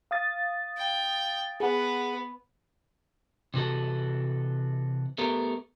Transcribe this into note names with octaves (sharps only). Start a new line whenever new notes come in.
F5 D#6 A6
G5
B3 G#4 F#5
C3 E3 F#4 A4
A3 B3 G4 A4 A#4